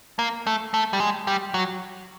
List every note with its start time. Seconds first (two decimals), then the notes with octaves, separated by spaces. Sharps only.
0.19 A#3
0.47 A3
0.74 A3
0.93 G3
1.00 G#3
1.27 G3
1.54 F#3